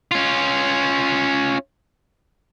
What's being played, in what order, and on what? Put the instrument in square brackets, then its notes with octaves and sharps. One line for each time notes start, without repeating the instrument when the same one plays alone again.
[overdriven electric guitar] C#4 F4